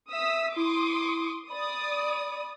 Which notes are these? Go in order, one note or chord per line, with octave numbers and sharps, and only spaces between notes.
E5 D#6 E6 B6
E4 C6 D6 D#6
D5 B5 D#6